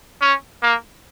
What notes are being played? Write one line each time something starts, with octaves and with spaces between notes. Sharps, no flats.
C#4
A#3